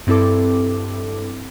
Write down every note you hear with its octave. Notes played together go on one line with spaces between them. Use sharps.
G2 C4 E4 A4 D6